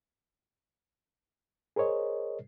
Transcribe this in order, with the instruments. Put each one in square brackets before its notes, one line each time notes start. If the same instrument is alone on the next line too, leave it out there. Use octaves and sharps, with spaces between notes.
[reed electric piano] G#4 A#4 C5 C#5 D#5